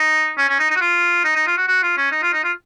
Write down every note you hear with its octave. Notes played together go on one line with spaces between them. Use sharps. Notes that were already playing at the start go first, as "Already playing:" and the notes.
Already playing: D#4
C#4
C#4
D#4
D#4
F#4
F4
D#4
D#4
F4
F#4
F#4
F4
C#4
D#4
F4
D#4
F4